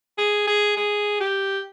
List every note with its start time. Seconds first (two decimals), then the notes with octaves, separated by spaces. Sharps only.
0.18 G#4
0.47 G#4
0.77 G#4
1.20 G4